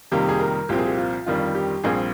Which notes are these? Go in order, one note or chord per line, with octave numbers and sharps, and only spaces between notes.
F2 C3 D#3 G3 A#3 G4
G#4
A#4
C2 A#2 F3 C4 G4
G#4
G4
F4
G1 F2 D#3 G3 F4
G4
A#1 A#2 G3 C4 G#4